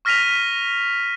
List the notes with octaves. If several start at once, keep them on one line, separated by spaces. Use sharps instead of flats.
C#6 F6 A#6 B6 D#7 F7